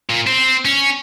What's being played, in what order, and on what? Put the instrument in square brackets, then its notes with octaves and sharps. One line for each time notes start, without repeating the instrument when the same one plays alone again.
[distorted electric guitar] A#2
C4
C#4